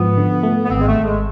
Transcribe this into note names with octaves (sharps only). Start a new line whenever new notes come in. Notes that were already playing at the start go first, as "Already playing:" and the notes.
Already playing: G#2 F3 B3
D3
A3
B3
G#1 C4
G#3
A3
G#1
G#3